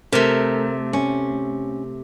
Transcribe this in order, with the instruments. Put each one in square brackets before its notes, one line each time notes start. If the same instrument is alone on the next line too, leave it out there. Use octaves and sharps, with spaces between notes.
[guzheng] C3 A3 [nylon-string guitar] A#4
[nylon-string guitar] C#4